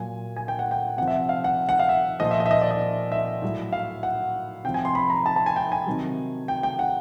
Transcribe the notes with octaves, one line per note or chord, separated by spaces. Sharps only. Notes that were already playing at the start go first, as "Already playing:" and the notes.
Already playing: A#2 F#3 G#5
G#5
G5
F#5
G5
C3 F3 F#5
E5
F5
F#5
F#5
F5
E5
A#2 F3 D#5
E5
D#5
E5
D#5
D5
D#5
E5
A2 F#3
F5
F#5
C3 F3 G5
G#5
C6
B5
A#5
A5
A5
G#5
G5
G#5
C3 D#3 F#3
G5
G5
F#5